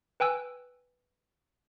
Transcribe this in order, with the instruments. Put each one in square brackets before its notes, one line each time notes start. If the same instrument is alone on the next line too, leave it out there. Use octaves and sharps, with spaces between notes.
[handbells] B4 G5 G#5 E6 F#6